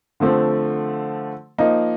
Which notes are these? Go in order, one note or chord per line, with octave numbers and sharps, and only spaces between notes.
D3 F3 A3 C4
F3 A#3 D#4